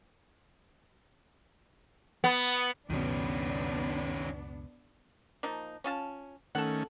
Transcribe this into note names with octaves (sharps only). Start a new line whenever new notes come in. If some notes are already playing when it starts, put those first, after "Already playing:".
B3
C#2 F#2 B2 D#3 B3 C#4 D4
F3 A#3 D#4
C#4 F4 A5
D#3 A3 C#4 A4 F#5